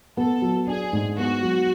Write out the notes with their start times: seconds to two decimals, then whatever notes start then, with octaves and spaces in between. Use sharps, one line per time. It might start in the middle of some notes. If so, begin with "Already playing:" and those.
0.17 B3 A4
0.42 F#3
0.67 D4 G#4
0.93 G#2
1.18 B3 F#4
1.42 F#3